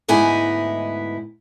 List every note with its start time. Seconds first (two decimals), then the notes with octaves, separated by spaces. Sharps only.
0.08 D2 G#2 B3 D#4 E4 G#5